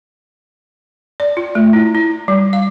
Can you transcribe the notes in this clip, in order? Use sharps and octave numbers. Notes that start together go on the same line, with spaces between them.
D5
F4
A3
E4
E4
G3
F5